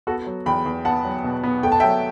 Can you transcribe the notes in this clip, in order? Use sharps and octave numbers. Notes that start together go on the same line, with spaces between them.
B3 F#4 A4
F#3
E2 G5 B5
E2
B3 F#5 A5
F#3
B2
B3
A3 G5
A5
E5 G5
F#3